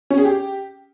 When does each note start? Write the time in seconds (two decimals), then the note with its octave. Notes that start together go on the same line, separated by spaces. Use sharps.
0.10 C#4
0.18 G#4
0.25 G4